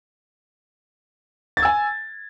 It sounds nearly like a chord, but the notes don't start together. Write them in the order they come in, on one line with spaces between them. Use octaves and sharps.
A6 G#6 E6 G#5